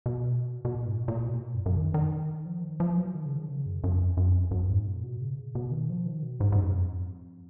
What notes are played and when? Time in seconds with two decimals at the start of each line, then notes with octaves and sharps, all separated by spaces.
0.06 B2
0.65 B2
0.74 A#2
0.86 G#2
0.97 A#2
1.08 A#2
1.25 B2
1.42 A#2
1.55 F#2
1.66 F#2
1.77 D#3
1.94 D#3
2.46 F3
2.63 D#3
2.80 F3
2.97 F#3
3.15 D#3
3.26 C#3
3.37 D#3
3.49 C#3
3.66 F#2
3.84 F#2
4.00 F2
4.17 F#2
4.34 F2
4.51 F#2
4.69 G#2
4.86 A#2
5.03 B2
5.21 C#3
5.55 B2
5.72 D#3
5.90 F3
6.07 D#3
6.23 B2
6.40 G#2
6.52 G#2
6.58 F#2
6.75 F2